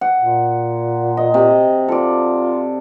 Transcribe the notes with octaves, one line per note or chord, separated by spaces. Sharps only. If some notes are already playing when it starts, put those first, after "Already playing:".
F#5
A#2
D#5
C3
F4 A4 D5